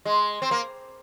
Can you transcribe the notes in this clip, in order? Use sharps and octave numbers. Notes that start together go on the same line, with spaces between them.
G#3
C4
A#3